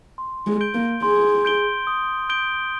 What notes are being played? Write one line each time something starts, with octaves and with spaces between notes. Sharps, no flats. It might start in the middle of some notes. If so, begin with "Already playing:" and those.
C6
G#3
G6 D7 G7
A#3
G#4 C6
G6 D7 G7
D#6
G6 D7 G7